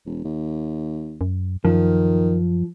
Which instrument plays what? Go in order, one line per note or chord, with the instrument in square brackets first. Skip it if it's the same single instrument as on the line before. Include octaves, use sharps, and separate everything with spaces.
[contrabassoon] E1
D#2
[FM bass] F#2
[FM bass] F#2 [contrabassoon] D#3 [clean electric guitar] F3